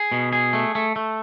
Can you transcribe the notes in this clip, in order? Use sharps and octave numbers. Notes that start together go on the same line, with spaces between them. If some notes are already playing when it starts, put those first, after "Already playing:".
Already playing: G#4
B2
G#4
A3
A3
A3